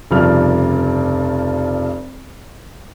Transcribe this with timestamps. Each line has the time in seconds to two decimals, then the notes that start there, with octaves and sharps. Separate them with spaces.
0.11 F1 G2 C#3 F3 D5 F6